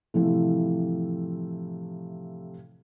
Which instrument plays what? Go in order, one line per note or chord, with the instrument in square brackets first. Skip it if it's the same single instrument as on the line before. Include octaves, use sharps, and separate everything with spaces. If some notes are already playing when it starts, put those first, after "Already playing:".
[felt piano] A2 C3 E3 F3 A3